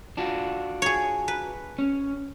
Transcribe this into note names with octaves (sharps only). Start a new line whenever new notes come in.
D4 F4 F#4
G#4 C#5
B4
C#4